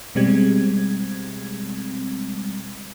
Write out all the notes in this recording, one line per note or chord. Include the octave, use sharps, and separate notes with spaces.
B2 G3 G#3 C4 G#6